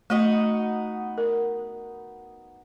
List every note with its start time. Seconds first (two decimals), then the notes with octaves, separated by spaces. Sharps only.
0.10 A3 B3 D#4 F#4
1.18 A#4